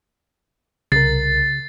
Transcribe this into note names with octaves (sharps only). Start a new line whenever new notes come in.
C2 C#3 A#4 A6 C7